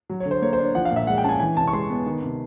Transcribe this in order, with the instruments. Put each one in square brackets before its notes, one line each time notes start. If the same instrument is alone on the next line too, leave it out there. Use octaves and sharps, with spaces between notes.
[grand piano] F#3
C#5
D3
C5
A#3 C#5
D4 C5
C#5
F3 F#5
F5
A#2
E5
G#3 F#5
G5
C#4 A5
G#5
E3 G#5
C3 A5
C#6
G#3 C6
B3
D#3
C3